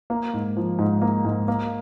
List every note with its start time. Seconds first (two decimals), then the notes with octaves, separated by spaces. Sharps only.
0.10 A#3
0.34 G#2
0.57 F3
0.79 G#2
1.02 A#3
1.25 G#2
1.48 A#3